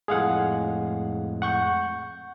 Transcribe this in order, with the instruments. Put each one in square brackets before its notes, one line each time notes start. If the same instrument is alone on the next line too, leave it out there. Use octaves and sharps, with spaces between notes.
[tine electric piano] F2 A2 G#3 [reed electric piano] G#4 F5 F#5
[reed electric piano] F#5 C#6 G6